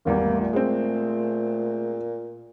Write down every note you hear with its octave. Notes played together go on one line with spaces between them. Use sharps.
G#1 E2 G3 A#3
A3
A#2
G#3 C4